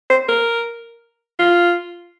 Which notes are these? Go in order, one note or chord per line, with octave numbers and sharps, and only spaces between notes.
C5
A#4
F4